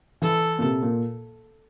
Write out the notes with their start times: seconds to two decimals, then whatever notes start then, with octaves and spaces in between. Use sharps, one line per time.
0.22 E3 A4
0.59 A#2
0.63 C3
0.83 A#2